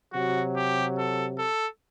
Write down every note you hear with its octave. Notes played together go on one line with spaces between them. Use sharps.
C3 F#3 F#4
G4
A4
A4